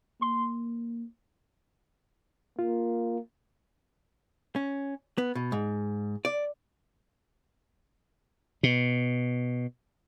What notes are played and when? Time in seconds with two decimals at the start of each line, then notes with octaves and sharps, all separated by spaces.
0.21 A#3 C6
2.59 A#3 F4
4.56 C#4
5.18 B3
5.35 B2
5.52 G#2
6.25 D5
8.63 B2